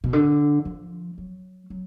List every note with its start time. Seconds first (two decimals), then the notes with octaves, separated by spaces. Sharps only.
0.04 B2
0.13 D3
0.65 F3
1.18 F#3
1.70 F#3